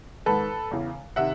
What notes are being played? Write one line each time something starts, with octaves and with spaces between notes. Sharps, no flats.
G#2 D#3 A4 B4
E2 C#3 E3
C3 D#3 E5 F#5